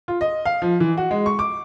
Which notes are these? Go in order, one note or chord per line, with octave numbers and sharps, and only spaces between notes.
F4
D#5
F5
F3
E3
F#4
G#3
C#6
D6